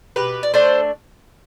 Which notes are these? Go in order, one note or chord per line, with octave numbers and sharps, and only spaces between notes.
B2 G4 B4
D5
A3 D4 A4 C5